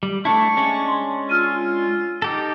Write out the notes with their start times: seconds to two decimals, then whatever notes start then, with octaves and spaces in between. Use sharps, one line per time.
0.03 G3
0.25 A3 D4 E4 A5 C#6
0.57 G#3 C#4 D4
0.88 C6
1.29 F4 E6 F6 D#7
2.22 D#4 G4 A4